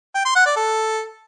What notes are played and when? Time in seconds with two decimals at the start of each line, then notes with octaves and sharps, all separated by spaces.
0.15 G5
0.25 C6
0.36 F#5
0.46 D5
0.56 A4